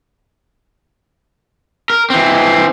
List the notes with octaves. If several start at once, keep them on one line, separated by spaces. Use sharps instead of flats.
A#4
E3 C4